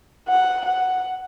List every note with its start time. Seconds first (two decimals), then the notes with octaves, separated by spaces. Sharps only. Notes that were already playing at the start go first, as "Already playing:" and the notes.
0.29 F#5
0.65 F#5